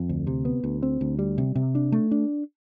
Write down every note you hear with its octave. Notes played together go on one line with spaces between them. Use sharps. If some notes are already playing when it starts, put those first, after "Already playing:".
Already playing: F2
D2
C3
B3
D2
C4
D2
G3
C3
C3
D4
A3
D4